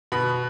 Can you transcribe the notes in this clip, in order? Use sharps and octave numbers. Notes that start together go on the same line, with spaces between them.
B2 B5